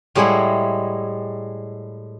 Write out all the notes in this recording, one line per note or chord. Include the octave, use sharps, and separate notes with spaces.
A2 G3 G#3 E4 G#4 F#5